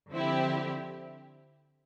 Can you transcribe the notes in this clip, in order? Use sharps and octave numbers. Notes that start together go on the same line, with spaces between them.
D3 F3 C4 E4 G4